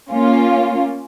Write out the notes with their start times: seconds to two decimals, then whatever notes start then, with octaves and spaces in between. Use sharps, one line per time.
0.11 A#3 C#4 F4